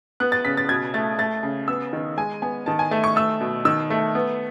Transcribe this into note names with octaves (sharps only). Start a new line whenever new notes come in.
B3 F#6
A6
C#3 B6
A6
B2 G#6
A3 A6
A3 A6
C#3
B3 E6
D#3
G#3 G#5
B3 G#5
D#3 A5
G#5
A3 A5
C#6
A3 E6
B2
D#3 E6
A3
B3